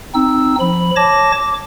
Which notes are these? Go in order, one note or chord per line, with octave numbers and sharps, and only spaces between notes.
C4 D#4 E6
F3 B5
C#5 A5 D6 A#6
D6